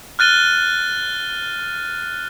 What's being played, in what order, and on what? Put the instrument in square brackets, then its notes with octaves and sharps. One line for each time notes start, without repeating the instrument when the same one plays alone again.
[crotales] F6 F#6 A6 D#7 G7